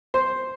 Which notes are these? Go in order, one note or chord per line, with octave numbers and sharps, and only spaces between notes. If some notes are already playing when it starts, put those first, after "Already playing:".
C5